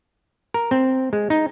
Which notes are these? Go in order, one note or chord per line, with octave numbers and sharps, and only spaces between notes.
A#4
C4
G#3
D#4